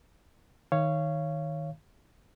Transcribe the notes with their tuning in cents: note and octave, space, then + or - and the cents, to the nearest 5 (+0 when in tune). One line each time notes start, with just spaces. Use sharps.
D#3 +5 C#5 +0 F5 -25